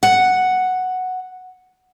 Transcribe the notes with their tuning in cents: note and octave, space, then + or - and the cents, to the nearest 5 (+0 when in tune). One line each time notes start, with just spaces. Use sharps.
F#5 +0